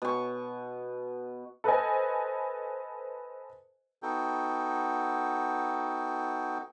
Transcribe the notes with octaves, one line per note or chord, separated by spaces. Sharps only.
B2 C#6
A4 B4 C5 D#5 G#5
B3 D#4 F#4 A4 G5